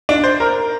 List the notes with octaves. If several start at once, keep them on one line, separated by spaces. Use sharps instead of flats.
D4
C5
A#4